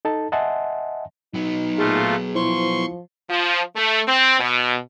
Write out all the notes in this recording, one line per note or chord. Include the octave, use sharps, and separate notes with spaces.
D#4 A4 A5
D#5 E5 F#5 G#5 A5 C6
F#3 B3 D#4
A#2 A3 F4 G#4
F3 E4 C5 C6 C#6
F3
A3
C4
B2